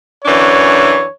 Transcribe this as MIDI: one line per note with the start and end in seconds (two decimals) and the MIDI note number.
0.25 1.04 42
0.25 1.04 52
0.25 1.04 62
0.25 1.13 73